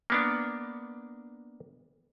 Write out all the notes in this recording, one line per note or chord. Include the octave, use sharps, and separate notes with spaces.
A#3 B3 D4